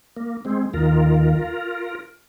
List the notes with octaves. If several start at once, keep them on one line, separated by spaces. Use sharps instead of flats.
A#3
G#3 C4
D#2 D#3 F4 A#4